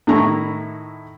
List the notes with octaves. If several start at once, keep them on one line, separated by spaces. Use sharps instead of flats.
A2 D#3 E4 A#5 C#6